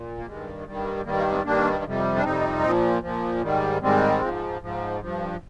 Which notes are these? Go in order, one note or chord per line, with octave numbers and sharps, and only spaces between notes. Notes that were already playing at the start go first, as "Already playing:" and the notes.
Already playing: A#2
A#3
G2 D#3 G3 G#3
G2 D#3 G3
G2 D#3 G3 A#3
A#3
G#3 C4
G2 D#3 G3 A#3 D4
F2 C3 G3
D4
F2 C3 G3 C4 D#4
A#2 F3
A#2 F3
G#2 D#3 G3
G#2 D#3 G3 G#3 C4
G#2 F3
G#2 F3
G2 F3